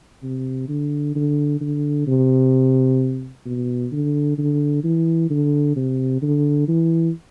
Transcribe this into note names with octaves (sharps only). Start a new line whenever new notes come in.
C3
D3
D3
D3
C3
B2
D3
D3
E3
D3
C3
D3
E3